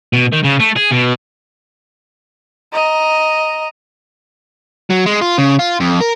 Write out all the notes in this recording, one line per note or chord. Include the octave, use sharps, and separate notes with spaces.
B2
D#3
C#3
A3
G#4
B2
D#5 A#5
F#3
G#3
F4
C#3
F4
F2
A#4